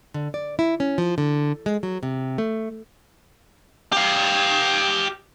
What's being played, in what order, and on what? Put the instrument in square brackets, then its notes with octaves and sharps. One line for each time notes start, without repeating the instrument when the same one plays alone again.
[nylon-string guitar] D3
D5
E4
C#4
F3
D3
G#3
F#3
C3
A3
[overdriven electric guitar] G4 F5